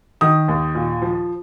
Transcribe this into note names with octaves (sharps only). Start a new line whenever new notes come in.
D#3 D#6
D#2
A#2
F3